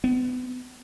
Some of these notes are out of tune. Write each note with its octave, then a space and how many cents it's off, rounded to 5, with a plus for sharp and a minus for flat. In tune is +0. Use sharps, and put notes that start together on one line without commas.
B3 +30